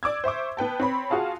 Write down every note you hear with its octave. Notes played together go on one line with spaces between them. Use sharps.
D5 D6 E6 G#6
C5 E5 C#6 D6
B3 B4 G5 A5
C4 C#5 B5
F4 F#4 G#4 F5 A5